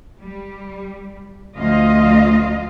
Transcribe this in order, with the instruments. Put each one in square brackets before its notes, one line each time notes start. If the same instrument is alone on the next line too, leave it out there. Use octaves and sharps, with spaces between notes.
[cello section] G3
D2 F3 F4 D#5 F5